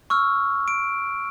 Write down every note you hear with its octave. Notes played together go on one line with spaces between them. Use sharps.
C#6 E6 F6
D7